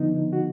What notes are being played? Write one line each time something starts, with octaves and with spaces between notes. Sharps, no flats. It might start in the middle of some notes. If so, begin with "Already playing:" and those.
Already playing: D3 F3 B3 D#4
F#4